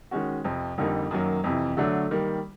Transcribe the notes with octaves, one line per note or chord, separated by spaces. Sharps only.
D#3 G#3 C#4 F#4
F2 C3 F3
F2 D3 G3 A#3 D#4
F#2 D#3 F#3 A#3
F2 C3 E3
D3 F#3 A3 D4
D#3 G3 A#3